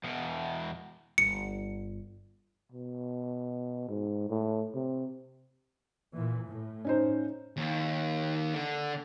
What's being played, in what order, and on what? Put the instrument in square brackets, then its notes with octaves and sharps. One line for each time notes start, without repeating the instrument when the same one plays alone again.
[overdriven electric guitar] E2 B2
[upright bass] G1 [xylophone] C#7
[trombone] B2
G#2
A2
C3
[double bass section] A#2 E3
A2
[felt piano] C#4 D#4 C5
[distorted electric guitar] D#2
D3